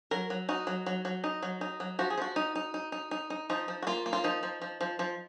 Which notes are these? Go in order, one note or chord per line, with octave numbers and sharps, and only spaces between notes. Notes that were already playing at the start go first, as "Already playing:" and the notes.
F#3 A#4
F#3
D#4 F#4
F#3
F#3
F#3
D#4
F#3
D#4
F#3
F3 F#4
G#4
F3 F#4
D#4
D#4
D#4
D#4
D#4
D#4
F3 D#4
F3
F#4
A#3 F4
A#3
F4
F3 D#4
F3
F3
F3
F3